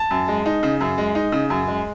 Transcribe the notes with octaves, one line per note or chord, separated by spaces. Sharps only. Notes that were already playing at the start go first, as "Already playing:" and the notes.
Already playing: A5
F#2
G#3
D#4
C#3
F#2
G#3
D#4
C#3
F#2
G#3